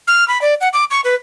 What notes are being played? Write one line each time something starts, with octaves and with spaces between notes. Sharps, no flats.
F6
B5
D5
F#5
D6
C#6
B4